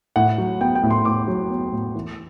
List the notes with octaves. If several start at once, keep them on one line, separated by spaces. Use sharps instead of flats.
A2 F#5
F#3
B3 G5
G5
A2
C6
A2 D6
F#3
B3
A2
E3